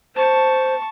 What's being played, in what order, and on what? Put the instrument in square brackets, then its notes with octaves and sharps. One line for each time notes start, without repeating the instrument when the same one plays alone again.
[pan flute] C5 [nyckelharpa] A5 C#6